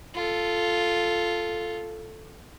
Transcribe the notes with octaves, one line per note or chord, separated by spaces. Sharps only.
F4 A4